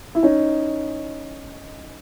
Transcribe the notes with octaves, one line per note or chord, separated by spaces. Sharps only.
E4
C#4 D#4